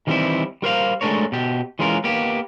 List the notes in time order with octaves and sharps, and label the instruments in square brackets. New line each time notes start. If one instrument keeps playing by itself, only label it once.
[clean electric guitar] D#3 E3 G3 A3 C4 E4
G3 A#4 C5 F5
G#3 A3 D4 A#4 C#5
B2 G4
E3 G#3 C#4 F4 A#4
A#3 B3 G4